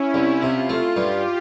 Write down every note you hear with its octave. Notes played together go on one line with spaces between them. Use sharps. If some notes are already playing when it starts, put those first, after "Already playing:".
Already playing: C#4 E4
C2
C3 F4
A3
G2 G4